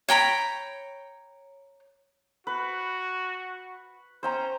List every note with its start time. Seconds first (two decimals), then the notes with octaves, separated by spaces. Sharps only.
0.09 C#5 G5 A#5 B5
2.47 F#4 B4
4.23 C#4 C5 G5 A#5